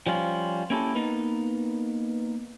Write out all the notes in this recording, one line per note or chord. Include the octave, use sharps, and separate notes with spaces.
F3 G3 C#4 F4
A#3 C#4 E4 G4 A4
A#3 B3 D#4 A#4 B4